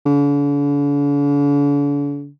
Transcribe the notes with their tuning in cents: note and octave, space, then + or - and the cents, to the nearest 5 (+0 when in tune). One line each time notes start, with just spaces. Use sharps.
D3 -45